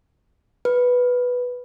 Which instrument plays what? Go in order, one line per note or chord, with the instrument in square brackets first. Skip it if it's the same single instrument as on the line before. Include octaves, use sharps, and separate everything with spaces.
[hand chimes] B4